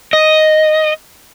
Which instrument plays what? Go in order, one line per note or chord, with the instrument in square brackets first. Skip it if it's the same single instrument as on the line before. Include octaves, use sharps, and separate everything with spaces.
[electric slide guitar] D#5